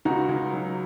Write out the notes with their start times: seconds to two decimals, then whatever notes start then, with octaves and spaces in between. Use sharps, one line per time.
0.05 C#2 D#4 F#4
0.29 C#2
0.52 F#3